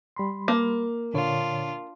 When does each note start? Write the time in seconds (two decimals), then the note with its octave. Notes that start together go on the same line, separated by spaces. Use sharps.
0.16 G3 B5 C6
0.48 A#3
1.14 A#2 D3 D4 F4 C#5